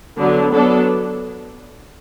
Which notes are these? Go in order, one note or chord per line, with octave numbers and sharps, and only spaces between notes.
D3 F#3 B3
F#3 B3 D4 A4